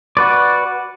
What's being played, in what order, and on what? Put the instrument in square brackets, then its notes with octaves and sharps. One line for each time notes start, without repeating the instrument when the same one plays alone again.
[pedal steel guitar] F#4 B4 D5